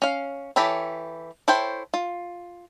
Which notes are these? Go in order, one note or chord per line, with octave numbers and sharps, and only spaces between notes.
C#4 F5
E3 G4 A4 C#5 B5
E4 A4 C5 C#5 G5
F4